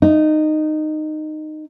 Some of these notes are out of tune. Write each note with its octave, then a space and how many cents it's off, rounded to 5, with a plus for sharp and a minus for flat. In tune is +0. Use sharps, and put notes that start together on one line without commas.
D#4 -15